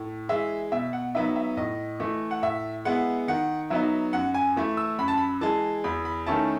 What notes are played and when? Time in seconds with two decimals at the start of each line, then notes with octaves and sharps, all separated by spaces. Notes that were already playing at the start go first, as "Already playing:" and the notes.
Already playing: A2
0.29 E3 G#3 E5
0.72 B2 E5
0.93 F#5
1.15 F#3 B3 D#4 E5
1.36 E5
1.57 A2 D#5
2.00 E3 A3
2.31 F#5
2.43 A2 E5
2.85 G#3 B3 E4 F#5
3.28 D#3 F#5
3.70 F#3 B3 D#4 E5
4.13 F#2 F#5
4.34 G#5
4.56 E3 A3 E4
4.77 E6
4.99 F#2 B5
5.08 A5
5.17 B5
5.41 E3 G#3 A5
5.84 E2 B5
6.05 B5
6.27 D#3 A3 C#4 E4 A5